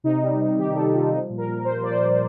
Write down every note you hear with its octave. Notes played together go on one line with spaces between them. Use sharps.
C3 D#4
G3
C3
D#3 G4
C3 A4
G3 F4
F3 D#4
A#2
A#4
A#2
A#4
F3 C5
F3 D5
C5
A#2